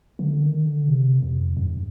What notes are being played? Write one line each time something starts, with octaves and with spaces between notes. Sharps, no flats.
D3
D#3
D3
C3
F2
G2